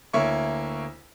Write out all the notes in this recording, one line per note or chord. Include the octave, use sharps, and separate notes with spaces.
D2 A#3 E4 C#5 E5 C#6